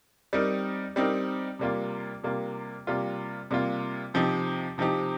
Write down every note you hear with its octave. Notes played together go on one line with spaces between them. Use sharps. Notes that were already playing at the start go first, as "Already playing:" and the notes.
G3 C4 D#4 A#4
G3 C4 D#4 A#4
C3 G3 A#3 F4
C3 G3 A#3 F4
C3 G3 A#3 F4
C3 G3 A#3 F4
C3 F3 C4 D#4 G4
C3 F3 C4 D#4 G4